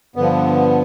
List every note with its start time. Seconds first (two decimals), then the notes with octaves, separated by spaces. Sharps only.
0.16 G2 D3 F3 B3